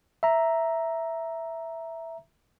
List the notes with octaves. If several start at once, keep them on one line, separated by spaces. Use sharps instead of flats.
E5 A#5